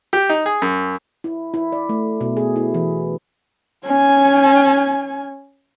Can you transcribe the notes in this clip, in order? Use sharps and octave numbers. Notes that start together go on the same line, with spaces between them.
G4
D#4
G#4
F#2
E4
E4
D5
A3
B2
G#4
E4
E3
C#4 G#5